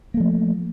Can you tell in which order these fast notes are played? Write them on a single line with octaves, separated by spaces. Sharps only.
A#3 A3 F3